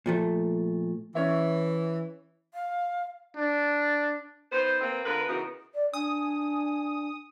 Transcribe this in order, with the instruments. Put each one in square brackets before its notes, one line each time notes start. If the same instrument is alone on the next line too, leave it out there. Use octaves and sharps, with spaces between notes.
[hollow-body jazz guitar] A#2 F3 A3
[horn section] E3 [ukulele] C#4 C#5 E5
[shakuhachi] F5
[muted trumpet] D4
[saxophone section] B3 D#4 B4 C5
A#3 C4 B4
D3 F4 A#4 B4
C#3 E3 B3 D#4 F#4 A#4
[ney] D5
[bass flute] D4 [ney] G#5 [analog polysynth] D#6